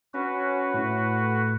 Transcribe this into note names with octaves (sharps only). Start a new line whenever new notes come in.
C#4 F#4 B4
A2